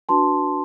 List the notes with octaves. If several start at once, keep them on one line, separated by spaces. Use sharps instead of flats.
D4 F#4 B4 A5 C6